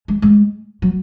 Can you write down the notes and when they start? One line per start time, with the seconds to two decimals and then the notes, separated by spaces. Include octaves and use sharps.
0.08 G#3
0.22 G#3
0.82 F#3